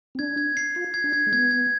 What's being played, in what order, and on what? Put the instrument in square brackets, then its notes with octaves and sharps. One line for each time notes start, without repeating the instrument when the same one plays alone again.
[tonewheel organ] C4
[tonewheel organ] D4 [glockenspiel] G#6
[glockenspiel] G#6
C7
[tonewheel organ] F4 [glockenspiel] C7
[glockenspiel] G#6
[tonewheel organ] D4
[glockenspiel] G#6
[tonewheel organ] G#3
[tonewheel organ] B3 [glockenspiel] G#6
[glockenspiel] G#6